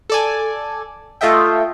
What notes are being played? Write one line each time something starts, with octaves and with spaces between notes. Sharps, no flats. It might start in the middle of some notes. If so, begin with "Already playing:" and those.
A4 D5 G#5
A3 F4 A4 D#5 E5 G5